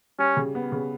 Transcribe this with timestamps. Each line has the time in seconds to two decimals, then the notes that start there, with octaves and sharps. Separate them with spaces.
0.19 G3 C#4
0.37 C#3
0.55 B3
0.72 C#3